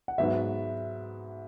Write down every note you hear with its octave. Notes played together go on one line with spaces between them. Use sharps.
F#5
G#2 F#3 B3 E5